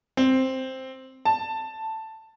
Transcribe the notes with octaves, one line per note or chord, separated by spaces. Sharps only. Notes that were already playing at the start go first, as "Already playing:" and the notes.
C4
A5